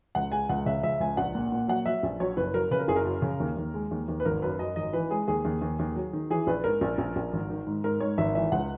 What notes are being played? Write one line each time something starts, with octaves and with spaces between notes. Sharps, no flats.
C#2 F#5
G#3 G#5
C#2 F#5
C#3 E5
C#2 E5
C#2 G#5
A#1 F#5
A#2
A#2
F#3 F#5
F#3 E5
A#1
F#3 C#5
F#1 B4
F#3 A#4
C#3 B4
A#4
F#1 G#4
A#4
F#2
C#3
D#2
D#2
G#3
D#2
D#2
B4
G#1 A#4
F#2 B4
F#2 D#5
G#1 D#5
E3 B4
G#3 G#4
D#2 G#4
D#2
D#2
D#2
F#3
D#3
E3 G#4
A#1 B4
G#2 A#4
A#1
A#1
A#1
G#1
D#3
G#2
G#2 A#4
G#2 C#5
G#1 E5
E3 E5
C#2 F#5